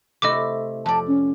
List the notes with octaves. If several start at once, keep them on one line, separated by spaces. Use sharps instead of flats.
C3 A3 E4 D#5 D6
F2 D5 A5
C#4